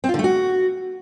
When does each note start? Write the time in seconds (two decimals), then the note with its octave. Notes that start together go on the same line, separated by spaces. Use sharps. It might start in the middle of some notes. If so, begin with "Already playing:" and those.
0.04 C4
0.09 F4
0.14 D3
0.19 A3
0.24 F#4